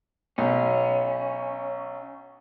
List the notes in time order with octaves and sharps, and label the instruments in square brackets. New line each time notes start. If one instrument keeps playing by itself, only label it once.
[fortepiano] B1 [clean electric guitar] C#4